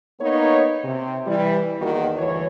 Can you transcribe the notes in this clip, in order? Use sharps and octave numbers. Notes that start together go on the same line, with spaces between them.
A#3 B3 D#4 C#5
C3
E3 G3
E2 D#3 A#3 F#4
D2 G2 E3 C#5